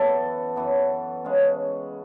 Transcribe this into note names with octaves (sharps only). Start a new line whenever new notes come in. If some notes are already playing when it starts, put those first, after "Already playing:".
Already playing: F#2 E3 B3 A4
F#2 E3 B3
C#3 G#3 C#4